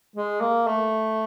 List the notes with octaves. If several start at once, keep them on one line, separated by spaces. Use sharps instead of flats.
G#3
A#3
A3